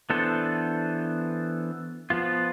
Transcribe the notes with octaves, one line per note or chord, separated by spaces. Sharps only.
E3 B3 D4 A4 C5
F3 B3 F4